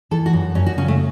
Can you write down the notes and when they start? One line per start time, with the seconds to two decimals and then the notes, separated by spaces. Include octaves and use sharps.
0.11 E3 A4
0.26 F#4
0.33 F#2
0.55 F#2 C#4
0.66 F#4
0.78 C#3 C#4
0.88 A3